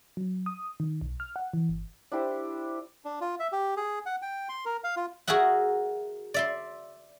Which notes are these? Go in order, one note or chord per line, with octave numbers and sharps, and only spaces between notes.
F#3
D#6
D#3
B1
F6
F#5
E3
G1
D4 E4 G4 C5
D4
F4
E5
G4
G#4
F#5
G5
C6
A#4
F5
F4
F#4 G#4 A#4 E5 F#5
D5 E5 C6